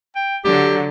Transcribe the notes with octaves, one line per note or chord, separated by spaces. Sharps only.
G5
D3 F#3 G4